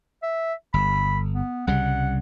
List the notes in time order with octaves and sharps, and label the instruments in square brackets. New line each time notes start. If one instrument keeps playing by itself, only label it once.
[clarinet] E5
[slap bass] G1 [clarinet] B5
[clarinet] B3
[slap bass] C2 C#3 G3 [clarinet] F#5